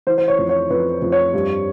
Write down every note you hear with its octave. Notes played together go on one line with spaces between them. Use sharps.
E3 C5
C5
C#5
F2
C#5
F2 B4
F2
C#5
G2